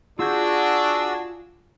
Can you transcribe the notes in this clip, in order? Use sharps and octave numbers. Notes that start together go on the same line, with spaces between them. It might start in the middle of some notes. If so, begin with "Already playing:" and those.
D4 F4 F#4 G#4 E6 G6